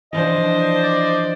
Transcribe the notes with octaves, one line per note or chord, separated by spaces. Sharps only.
E3 F3 D4 C5 D#5
D5